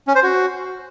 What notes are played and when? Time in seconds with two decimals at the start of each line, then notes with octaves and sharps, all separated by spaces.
0.07 C#4
0.15 C5
0.23 F#4